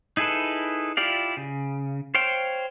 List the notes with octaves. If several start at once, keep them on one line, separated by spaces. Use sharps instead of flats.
D#4 E4 G#4 A4 B4
E4 F4 G4 D5 F5
C#3
C5 C#5 F5 G5